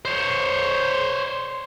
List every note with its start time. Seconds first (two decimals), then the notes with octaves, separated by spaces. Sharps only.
0.05 C5 C#5